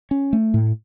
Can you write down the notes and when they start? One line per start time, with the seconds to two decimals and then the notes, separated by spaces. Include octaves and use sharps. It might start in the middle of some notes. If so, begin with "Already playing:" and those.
0.11 C#4
0.33 A3
0.54 A2